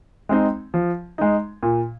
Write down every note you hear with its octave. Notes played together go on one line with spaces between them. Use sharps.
G#3 C4 D#4
F3
G#3 D#4
A#2